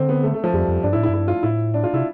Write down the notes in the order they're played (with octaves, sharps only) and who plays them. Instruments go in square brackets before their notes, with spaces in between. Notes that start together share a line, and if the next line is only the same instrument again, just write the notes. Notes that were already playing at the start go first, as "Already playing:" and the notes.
Already playing: [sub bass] D3 [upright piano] C4
[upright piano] B3
A3
A3
F3
[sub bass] F2 [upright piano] G3
[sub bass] F2
[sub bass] G2 [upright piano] D4
[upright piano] E4
[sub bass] A2
[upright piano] E4
[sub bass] G2
[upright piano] E4
F4
[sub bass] A2 [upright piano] E4
[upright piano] D4
F4
[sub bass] C3 [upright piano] E4